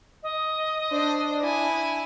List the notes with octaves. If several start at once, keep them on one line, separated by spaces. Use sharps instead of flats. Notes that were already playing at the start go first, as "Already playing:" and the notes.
D#5
D4 C5
E4 G#5